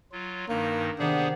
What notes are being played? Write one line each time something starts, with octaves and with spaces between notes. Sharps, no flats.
F#3 F4
G2 D#3 A#3 D#4
C3 D#3 B3 D4 G#4 C5 F#5